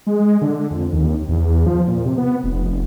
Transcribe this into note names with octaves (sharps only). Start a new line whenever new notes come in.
G#3
D3
F2
D#2
E2
F3
A#2
C3
B3
F1
F1